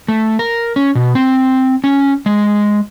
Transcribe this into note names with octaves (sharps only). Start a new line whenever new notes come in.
A3
A#4
C#4
B2
C4
C#4
G#3